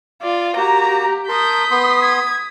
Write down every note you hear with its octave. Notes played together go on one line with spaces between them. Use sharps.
F4 D5
A#3 F#4 G4 A#5
A#4 A5 C6 D#6 G6 B6
B3 C6
G#6